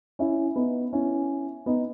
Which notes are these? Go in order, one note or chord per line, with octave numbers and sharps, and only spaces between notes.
C#4 E4
B3 D#4
C#4 E4
B3 D#4